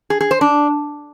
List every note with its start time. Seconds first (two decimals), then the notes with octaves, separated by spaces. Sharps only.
0.10 G#4
0.21 G#4
0.31 C5
0.41 D4